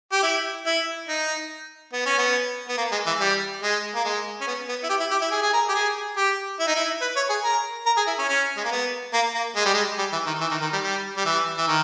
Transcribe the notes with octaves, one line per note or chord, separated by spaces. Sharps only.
G4
E4
E4
D#4
B3
C#4
B3
B3
A#3
G#3
E3
G3
G#3
A#3
G#3
C#4
B3
B3
E4
G4
E4
G4
E4
G#4
G#4
A#4
G4
G#4
G4
E4
D#4
E4
B4
C#5
G#4
A#4
A#4
G#4
E4
C#4
C#4
G#3
A#3
B3
A#3
A#3
G#3
G3
G#3
G3
E3
D#3
E3
D#3
D#3
G3
G3
G3
E3
E3
D#3